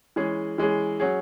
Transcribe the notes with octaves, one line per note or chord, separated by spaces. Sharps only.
E3 G#3 C#4 G#4
E3 G#3 C#4 G#4
F#3 C#4 G#4